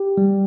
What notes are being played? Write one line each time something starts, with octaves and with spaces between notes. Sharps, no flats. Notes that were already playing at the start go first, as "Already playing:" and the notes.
Already playing: G4
G3